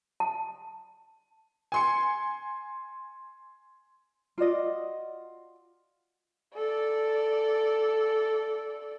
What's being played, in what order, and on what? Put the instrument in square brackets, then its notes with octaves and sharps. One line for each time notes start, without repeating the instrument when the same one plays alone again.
[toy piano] A5
[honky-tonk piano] G#5 C6 C#7
[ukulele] F4 F#4 D5 D#5
[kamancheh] A4 D5